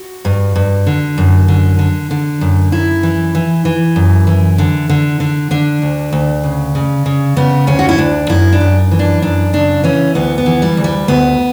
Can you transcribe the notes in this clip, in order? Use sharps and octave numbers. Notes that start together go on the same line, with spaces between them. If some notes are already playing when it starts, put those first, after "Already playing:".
Already playing: F#4
G2
G2
D3
F#2
D3
D3
D3
F#2
F#2 E4
E3
E3
E3
F#2
E3
D3
D3
D3
D3 D4
D2
D2
C#3
C#3
C#3
C#3 B3
D2 C#4
F#4
E4
D2 D4
F#2 E4
D4
F#2
E3
D4
F#2 D4
C#3 D4
E3 C#4
D2 B3
B3
E3
G3
D2
G3
D2 B3